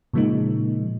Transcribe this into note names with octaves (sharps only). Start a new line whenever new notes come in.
A#2 C#3 F3 G#3 A#3 D#4